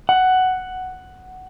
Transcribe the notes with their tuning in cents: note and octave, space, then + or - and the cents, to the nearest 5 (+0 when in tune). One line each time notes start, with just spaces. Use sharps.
F#5 +5